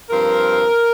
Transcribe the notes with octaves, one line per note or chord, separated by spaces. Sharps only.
G2 F3 C4 A#4